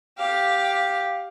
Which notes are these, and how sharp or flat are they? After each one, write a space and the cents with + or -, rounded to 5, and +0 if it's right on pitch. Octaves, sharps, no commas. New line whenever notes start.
G4 +0 F5 +10